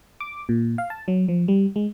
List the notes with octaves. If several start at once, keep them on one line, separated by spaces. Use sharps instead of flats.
D6
A#2
F5
A5
F#3
F3
G3
G#3